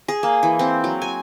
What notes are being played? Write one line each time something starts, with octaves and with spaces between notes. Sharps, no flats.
G#4
A#3
E3
C4
F#3
G#5